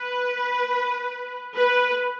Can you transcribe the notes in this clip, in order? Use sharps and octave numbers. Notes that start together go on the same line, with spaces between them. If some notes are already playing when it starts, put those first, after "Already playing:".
Already playing: B4
B4